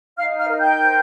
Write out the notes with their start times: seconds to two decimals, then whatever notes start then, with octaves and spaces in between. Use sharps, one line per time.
0.17 D#4 F5 F6
0.38 F5 F6
0.49 A#4
0.60 G5 G6
0.80 C5